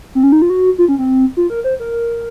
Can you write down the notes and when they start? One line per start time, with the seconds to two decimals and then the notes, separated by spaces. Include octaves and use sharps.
0.15 C4
0.23 C#4
0.32 D#4
0.42 F4
0.50 F#4
0.78 F4
0.88 C#4
0.98 C4
1.37 F4
1.50 A#4
1.64 C5
1.80 A#4